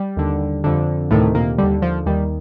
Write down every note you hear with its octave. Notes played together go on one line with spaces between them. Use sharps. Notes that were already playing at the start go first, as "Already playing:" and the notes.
Already playing: G3
D#2 D3
F2 D3
D2 A2 C3 D#3 A3
A#2 A#3
D#2 D3 G3
F3
D#2 D#3 G3